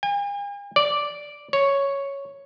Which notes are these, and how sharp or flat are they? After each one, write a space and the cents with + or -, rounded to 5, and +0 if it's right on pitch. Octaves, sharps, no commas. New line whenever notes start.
G#5 -45
D5 -5
C#5 +0